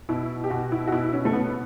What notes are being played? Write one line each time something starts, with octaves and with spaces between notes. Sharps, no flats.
B2 E4
G4
B2 F#4
E4
F#4
B2 E4
C#4
A3
B2 B3